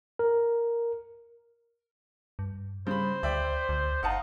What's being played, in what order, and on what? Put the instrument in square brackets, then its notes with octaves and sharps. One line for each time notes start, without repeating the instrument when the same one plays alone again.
[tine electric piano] A#4
[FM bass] G2
[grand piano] C#3 B5 [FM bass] G3 [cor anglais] C5
[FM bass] D2 [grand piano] D5 E5 G5
[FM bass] D2
[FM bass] G1 [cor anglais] D#4 [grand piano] F5 F#5 A5